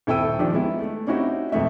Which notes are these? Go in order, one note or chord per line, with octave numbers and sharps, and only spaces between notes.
D#1 E4 A4 G5 E6 D#7
D#3 F3 D4 G4
G#3 B3 E4
A3
C4 C#4 D#4 E4 F#4 G4
E1 F2 A3 E5